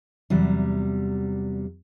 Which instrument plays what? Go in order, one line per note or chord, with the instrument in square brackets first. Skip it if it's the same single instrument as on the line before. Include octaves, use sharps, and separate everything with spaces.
[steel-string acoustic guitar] E2 C3 F#3 G3